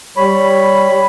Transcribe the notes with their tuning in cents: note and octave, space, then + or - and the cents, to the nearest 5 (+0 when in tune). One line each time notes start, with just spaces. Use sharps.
G3 +0 C#5 +0 B5 +0